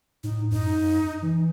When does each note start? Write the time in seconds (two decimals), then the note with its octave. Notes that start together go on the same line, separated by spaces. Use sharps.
0.24 A2 D#4
0.51 F#2 D#4
1.22 E3